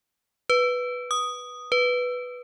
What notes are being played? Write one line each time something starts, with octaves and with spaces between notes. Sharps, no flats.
B4
D#6
B4